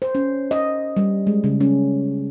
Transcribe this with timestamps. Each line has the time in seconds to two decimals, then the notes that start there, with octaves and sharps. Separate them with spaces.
0.02 C5
0.15 C#4
0.51 D#5
0.97 G3
1.27 G#3
1.44 C#3
1.61 C#4